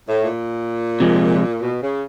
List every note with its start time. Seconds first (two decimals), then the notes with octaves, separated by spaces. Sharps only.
0.08 A2
0.24 A#2
1.00 C3 F3 G#3
1.61 B2
1.81 C#3